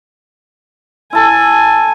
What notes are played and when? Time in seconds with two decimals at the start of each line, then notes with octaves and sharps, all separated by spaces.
1.13 E4 A4 G#5